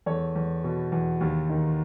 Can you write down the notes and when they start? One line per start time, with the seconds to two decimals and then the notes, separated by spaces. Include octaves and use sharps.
0.06 E2 A4 C#5
0.36 E2
0.64 B2
0.92 E2
1.21 D#2
1.50 D#3